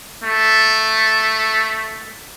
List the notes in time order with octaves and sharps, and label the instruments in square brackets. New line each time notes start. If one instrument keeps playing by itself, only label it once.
[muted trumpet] A3